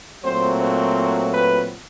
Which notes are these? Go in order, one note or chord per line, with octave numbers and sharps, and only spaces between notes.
A#2 F#3 A3 C4 C5
C5
B4